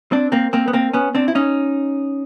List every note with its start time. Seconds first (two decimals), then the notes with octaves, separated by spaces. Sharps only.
0.12 C4 D4
0.32 A#3 C4
0.53 A#3 C4
0.68 B3
0.73 A#3 C4
0.93 B3 C#4
1.15 C4 D4
1.28 E4
1.35 C#4 D#4